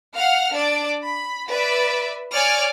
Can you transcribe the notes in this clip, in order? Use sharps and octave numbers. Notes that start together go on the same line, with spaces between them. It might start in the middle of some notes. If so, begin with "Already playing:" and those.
F5 F#5 F6
D4 D5
B5
B4 D5 E5
C#5 D5 G#5 D6 F6